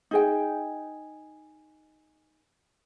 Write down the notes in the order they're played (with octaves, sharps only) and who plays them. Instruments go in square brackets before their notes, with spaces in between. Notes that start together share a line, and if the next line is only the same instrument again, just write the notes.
[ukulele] D#4 G#4 G5